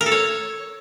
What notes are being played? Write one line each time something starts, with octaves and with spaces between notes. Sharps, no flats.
A#4
A4
C#5